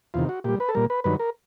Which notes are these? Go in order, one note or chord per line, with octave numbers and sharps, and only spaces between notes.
E2 C3 D#3 F4
F#4
A#2 G3 G4
B4
A4
A#2 G3 A#4
B4
G2 D#3 F#3 B4
A#4